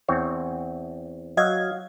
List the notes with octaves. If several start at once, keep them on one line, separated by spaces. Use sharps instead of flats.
E2 C4 C#5
F#3 D#5 F5 G#6